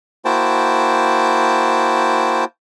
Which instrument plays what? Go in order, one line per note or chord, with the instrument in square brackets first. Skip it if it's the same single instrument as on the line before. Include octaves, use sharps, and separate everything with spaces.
[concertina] A#3 E4 F#4 C5 G5 A5